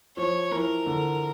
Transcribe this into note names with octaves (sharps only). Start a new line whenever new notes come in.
F3 C#5
E3 A#4
D3